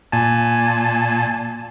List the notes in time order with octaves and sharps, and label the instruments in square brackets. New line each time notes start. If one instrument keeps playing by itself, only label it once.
[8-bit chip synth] A#2 G#5 A5